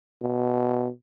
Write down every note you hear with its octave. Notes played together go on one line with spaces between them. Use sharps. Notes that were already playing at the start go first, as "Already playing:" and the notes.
B2